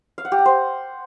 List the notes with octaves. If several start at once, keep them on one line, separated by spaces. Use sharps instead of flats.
F5
F#5
G4
F#5
C5